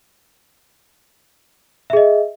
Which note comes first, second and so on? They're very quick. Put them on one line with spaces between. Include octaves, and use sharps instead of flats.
E5 G#4 D#5